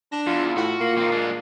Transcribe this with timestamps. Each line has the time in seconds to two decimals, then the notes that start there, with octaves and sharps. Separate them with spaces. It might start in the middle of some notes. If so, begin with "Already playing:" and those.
0.12 D4 A#6
0.27 E2 F4
0.57 A2 F#4
0.80 A#2 A#3
0.98 C4 D#4
1.12 G#3 D4